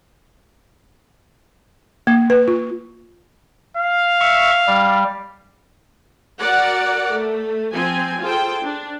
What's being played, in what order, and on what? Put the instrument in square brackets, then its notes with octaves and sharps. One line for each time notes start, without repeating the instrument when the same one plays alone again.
[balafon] A#3
B4
F4
[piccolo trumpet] F5
[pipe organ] E5 C#6
G3
[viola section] F#4 A#4 D5 F#5
A3
F3 C4 G#5
F4 G#4 A4 C5 G5
D4